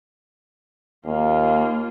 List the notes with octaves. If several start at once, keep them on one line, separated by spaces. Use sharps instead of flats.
D#2 A#3 F4